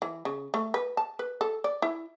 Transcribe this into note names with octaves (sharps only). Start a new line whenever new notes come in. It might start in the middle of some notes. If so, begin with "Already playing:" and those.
E3
C#3
A3
B4
A5
B4
A4
D5
E4